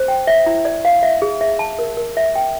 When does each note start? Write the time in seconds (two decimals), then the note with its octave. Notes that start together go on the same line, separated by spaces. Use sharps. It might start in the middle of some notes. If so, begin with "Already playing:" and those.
Already playing: C5
0.08 G5
0.27 E5
0.46 E4
0.65 D5
0.85 F5
1.03 E5
1.22 G#4
1.41 E5
1.59 A5
1.79 A#4
1.97 A#4
2.17 E5
2.35 G5